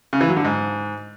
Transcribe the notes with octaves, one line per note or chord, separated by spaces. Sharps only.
C#3
E3
F#3
D3
G#2